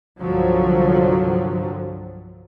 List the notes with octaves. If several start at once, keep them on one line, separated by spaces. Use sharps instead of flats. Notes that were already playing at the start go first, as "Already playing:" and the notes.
C2 G2 D3 F3 F#3